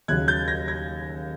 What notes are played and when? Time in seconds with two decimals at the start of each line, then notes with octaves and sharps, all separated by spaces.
0.08 D#2 C#3 F#3 F#6 G#6
0.28 G6 A6
0.48 G#6 A#6
0.68 G#6 A#6